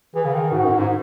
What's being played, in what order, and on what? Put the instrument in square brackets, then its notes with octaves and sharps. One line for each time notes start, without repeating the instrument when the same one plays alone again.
[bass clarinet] E3 [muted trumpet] G#4
[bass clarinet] C#3
D#3
[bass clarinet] G#2 [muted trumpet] F#4
[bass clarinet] F#2
A2
G#2